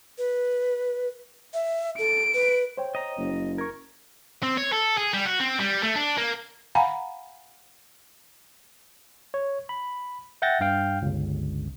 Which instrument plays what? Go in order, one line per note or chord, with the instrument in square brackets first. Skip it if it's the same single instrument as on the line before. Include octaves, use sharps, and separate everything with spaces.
[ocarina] B4
E5
[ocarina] A4 [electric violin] D7
[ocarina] B4
[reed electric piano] C5 C#5 G5
[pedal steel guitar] D#5 A#5
[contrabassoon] F#1
[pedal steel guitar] A#4 [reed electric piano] C#6 G#6
[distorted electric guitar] C4
C#5
A4
G#4
G3
F#4
C4
G3
A3
D4
A#3
[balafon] F5 F#5 G#5 A#5 B5
[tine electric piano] C#5
B5
E5 F#5 G5 G6 A6 A#6
G2 F5 G5
G1 C#2